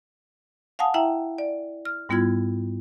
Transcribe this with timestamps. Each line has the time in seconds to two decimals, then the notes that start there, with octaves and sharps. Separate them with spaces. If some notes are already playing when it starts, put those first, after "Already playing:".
0.79 F5 F#5 G#5 A5 D#6
0.94 E4 E5 G5 A#5
1.38 D5
1.85 F6
2.09 G#2 G3 B3 E4 F4 G#6